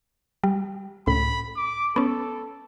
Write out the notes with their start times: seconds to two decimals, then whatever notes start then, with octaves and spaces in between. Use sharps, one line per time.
0.44 G3
1.07 C#2 A2 B5
1.56 D6
1.96 B3 C#4 A4